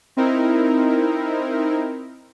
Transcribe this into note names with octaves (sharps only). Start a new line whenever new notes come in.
C4 D#4 E4 A#4